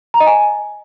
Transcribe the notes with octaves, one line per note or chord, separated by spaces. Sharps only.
A#5
D#5
G#5